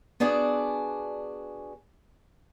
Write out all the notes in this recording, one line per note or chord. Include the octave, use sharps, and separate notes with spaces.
B3 D4 F#4 G#4 D5